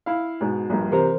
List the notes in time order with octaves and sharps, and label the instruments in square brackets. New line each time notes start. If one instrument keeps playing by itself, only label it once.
[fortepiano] E4 F5
G#2 B2
A#1 G2
[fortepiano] C3 A#5 [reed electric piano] E3 A#4 C5